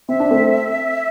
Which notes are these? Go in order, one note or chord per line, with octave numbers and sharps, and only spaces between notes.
C4 E5
D4
A3 C4